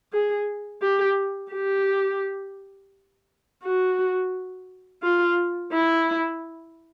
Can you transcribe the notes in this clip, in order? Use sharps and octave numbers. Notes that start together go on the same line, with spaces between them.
G#4
G4
G4
F#4
F4
E4